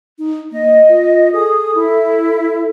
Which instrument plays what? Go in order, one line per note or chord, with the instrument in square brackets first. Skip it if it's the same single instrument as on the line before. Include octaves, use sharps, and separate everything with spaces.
[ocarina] D#4
[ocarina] A#3 [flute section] D#5
[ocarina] F4
[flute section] G#4 D#6 [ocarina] A4
[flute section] E4